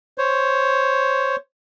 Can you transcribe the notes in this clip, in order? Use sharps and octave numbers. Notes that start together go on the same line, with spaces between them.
C5 C#5